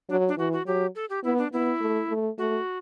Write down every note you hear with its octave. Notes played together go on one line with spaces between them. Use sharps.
F#3 D4
D4
E3 F#4
F#4
F#3 G4
A4
G4
B3 E4
D4
B3 E4
A3
A3
A3 F#4